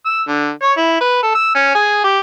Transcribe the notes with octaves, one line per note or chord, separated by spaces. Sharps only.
E6
D3
C#5
E4
B4
A4
E6
C#4
G#4
G4